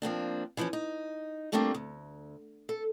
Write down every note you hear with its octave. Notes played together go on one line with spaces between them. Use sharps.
F3 A#3 C4 D4
E3 F3 G#3 C4 C#4
D#4
F3 G3 A3 A#3 C4 D4
D2
A4